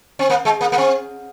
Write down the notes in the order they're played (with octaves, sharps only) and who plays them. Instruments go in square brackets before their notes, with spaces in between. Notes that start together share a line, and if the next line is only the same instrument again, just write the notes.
[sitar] C4
A#3
G#3
A#3
A#3
C4